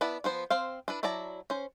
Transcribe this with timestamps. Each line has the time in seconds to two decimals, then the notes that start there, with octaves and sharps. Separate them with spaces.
0.01 B3 E4 B4 D5 A5
0.24 F3 B3 C5
0.50 C4 C5 F5
0.88 D4 E4 B4
1.03 F#3 E4 D5 A5 A#5
1.50 C#4 C5